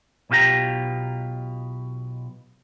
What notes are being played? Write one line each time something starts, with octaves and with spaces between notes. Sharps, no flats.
B1 B2 F4 G4 A#5